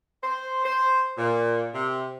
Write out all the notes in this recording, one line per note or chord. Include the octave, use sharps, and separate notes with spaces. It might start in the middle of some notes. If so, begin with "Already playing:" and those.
C5
C5
A#2
C3